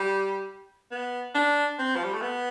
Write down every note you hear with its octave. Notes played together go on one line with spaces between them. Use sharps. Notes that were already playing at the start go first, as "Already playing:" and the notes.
Already playing: G3
B3
D4
C4
F3
G3
A3
B3